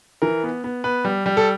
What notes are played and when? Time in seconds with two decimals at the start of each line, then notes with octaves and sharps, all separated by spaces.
0.22 E3 A#4
0.43 B3
0.64 B3
0.84 B3 B4
1.05 G3
1.26 G3
1.37 A4